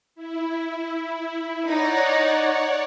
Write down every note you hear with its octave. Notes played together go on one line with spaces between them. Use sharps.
E4
D#4 C#5 D5 F#5